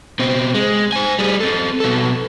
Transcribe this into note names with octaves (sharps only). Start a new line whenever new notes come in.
B2 C4
G#3
C5 G#5
G3 G#4
C4 A4
B2 A4